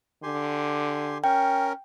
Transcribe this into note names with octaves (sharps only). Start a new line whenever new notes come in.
D3 G4 G#5 C6
C#4 A#4 G5